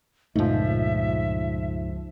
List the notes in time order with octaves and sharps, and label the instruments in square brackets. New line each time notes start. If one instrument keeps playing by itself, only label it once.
[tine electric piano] C#2 F3 [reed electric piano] G2 D#4 [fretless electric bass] A#2 A3 [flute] E5